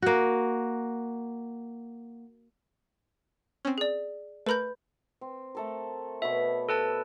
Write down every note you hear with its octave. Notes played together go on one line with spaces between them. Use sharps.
A#3 F#4
C4 C#4
G#4 D5
A3 A#4 B4 B5 G6
C4
A3 A4 A#4
B2 B3 C#5 E5
A4 B4 A5